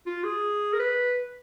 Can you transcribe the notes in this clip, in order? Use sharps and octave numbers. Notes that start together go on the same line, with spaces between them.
F4
G#4
A#4
B4